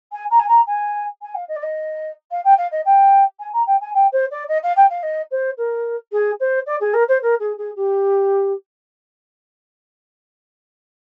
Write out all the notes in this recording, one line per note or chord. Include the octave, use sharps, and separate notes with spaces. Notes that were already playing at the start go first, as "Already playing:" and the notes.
G#5
A#5
G#5
A#5
G#5
G#5
F5
D#5
D5
D#5
F5
G5
F5
D#5
G5
G#5
A#5
G5
G#5
G5
C5
D5
D#5
F5
G5
F5
D#5
C5
A#4
G#4
C5
D5
G#4
A#4
C5
A#4
G#4
G#4
G4